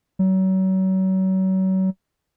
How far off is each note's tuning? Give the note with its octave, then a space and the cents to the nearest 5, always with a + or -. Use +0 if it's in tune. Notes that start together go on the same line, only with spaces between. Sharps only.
F#3 +35